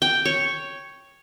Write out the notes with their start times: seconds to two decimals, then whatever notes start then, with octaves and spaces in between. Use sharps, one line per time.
0.02 G5
0.25 C#5